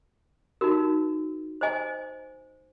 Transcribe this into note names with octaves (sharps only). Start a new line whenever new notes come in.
D#4 F#4 A#4
C5 D#5 G#5